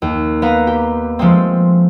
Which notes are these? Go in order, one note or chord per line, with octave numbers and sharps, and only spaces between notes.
D#2
B3 B4 F5 A#5
G4
F3 G#3 A3 C4